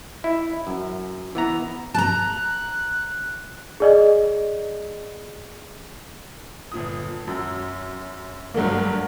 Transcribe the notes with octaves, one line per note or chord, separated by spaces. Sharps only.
E4
F#2
E3 B3 A#5
A5 A#5 F#6
G#4 D5 D#5
G1 A#2 D#6
F#2
G2 F#3 A3 A#3